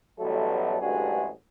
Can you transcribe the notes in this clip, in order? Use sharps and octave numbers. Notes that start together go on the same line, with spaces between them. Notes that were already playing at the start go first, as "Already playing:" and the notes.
A1 B2 F#3 G3 A3 A4
A1 D2 G2 G#3 F#4 G#4